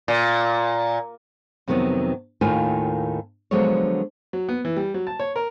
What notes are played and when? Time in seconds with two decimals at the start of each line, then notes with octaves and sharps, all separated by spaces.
0.08 A#2
1.68 F2 C3 D#3 F#3 B3
2.41 D#2 A2 D#3 F4 A#4 G#5
3.51 D3 F3 F#3 G#3 B3 C#5
4.33 F#3
4.49 B3
4.65 E3
4.77 G3
4.94 F#3
5.07 A5
5.19 C#5
5.36 A#4